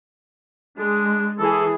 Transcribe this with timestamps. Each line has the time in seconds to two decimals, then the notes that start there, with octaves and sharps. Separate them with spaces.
0.78 G#3 D4
1.39 E3 G#4 A4